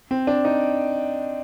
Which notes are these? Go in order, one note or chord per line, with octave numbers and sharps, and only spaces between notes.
C4
D4
D#4